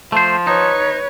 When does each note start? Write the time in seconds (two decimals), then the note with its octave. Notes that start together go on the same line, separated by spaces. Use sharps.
0.12 F3 A3 C5
0.47 D#4 B4 C#5